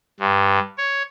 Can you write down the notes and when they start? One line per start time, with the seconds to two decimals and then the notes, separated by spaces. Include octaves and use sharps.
0.20 G2
0.78 C#5